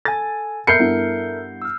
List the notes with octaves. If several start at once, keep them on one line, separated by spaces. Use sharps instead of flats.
A4 G#5 A6
A4 A#4 E5 B5 G6 C7 C#7
G2 B3 E4
E6 F6